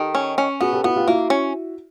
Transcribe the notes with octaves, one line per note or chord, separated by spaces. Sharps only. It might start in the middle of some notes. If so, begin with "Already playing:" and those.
Already playing: D#3 G4 A4
C#4
C#4
B3 F#4 G#4
G4 A4
B3 E4 F#4
F4 G4
A#3 E4 F#4
C#4